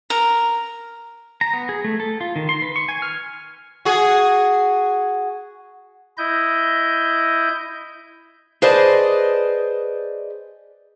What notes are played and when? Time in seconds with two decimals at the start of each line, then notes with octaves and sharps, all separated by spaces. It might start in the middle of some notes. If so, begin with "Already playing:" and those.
0.10 A#4
1.41 A#5
1.53 B3
1.69 G#4
1.84 A3
2.00 A4
2.21 F4
2.36 D#3
2.49 C6
2.62 B4
2.76 C#6
2.88 G#5
3.02 F6
3.85 F#4 G#4
6.18 E4 D#5 G6
8.62 G#4 B4 C5 D5 D#5 A5